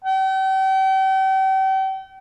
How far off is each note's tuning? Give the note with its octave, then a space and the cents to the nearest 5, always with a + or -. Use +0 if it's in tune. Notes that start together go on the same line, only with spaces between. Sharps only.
G5 -40